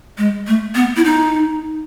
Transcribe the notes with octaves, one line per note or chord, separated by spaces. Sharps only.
G#3
A3
B3
E4
D#4